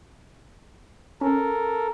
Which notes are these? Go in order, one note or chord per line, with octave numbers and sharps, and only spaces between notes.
C#4 A4 A#4